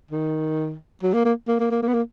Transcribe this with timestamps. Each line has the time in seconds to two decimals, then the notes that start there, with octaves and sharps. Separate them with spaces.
0.11 D#3
1.03 F#3
1.13 A#3
1.25 A#3
1.48 A#3
1.60 A#3
1.71 A#3
1.82 A#3
1.88 B3
1.94 A#3